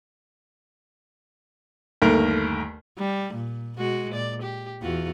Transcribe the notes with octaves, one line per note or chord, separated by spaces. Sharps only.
G1 D#2 A3 A#4
G3
A#2
B2 G#3 F#4
A#2 D5
G4
E2 F4 F#4